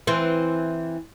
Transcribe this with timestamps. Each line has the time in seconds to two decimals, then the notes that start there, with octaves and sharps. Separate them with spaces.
0.07 E3 C4